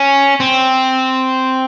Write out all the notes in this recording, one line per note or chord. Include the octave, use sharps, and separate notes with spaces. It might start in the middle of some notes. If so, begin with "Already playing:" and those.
Already playing: C#4
C4